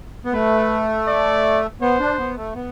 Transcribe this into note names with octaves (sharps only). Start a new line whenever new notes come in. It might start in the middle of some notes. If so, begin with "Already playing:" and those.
B3
A3 B4
D5
B3 C5
D4
B3
A3
B3